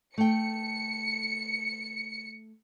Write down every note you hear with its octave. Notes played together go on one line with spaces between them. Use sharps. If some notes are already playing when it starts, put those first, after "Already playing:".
A3 G5 C#7